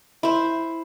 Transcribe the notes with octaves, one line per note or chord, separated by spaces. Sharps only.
E4 C5